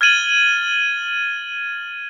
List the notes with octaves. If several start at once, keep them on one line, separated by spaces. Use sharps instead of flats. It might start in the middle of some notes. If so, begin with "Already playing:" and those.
F6 G#6 A6 D#7 F#7 G7